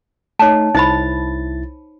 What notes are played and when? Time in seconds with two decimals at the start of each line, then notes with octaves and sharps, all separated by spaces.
0.39 A3 D#4 C#5 A5
0.75 C2 D#4 E4 C5 B5 A6